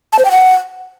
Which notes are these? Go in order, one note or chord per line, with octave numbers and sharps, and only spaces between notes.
A5
C5
G5
F#5